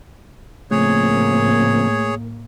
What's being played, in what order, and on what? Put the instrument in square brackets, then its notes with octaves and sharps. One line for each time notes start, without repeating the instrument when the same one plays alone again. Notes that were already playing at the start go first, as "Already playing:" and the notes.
[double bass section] A2 A#3 [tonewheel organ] C#3 F3 C4 [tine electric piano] A3 [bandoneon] G#4 C#5